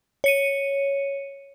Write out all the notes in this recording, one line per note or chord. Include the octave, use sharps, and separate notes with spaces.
C#5 C#7 D#7